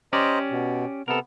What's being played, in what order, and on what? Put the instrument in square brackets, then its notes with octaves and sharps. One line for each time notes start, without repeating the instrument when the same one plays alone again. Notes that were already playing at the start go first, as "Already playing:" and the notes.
[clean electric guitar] C#4 G4 D5 [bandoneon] C5 D#5 A#5
[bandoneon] B2
[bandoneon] C3 B3 [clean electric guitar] A4 A#4